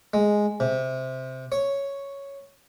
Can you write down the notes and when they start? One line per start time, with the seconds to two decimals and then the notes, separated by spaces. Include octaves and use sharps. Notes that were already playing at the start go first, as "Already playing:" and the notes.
0.14 G#3
0.60 C3
1.52 C#5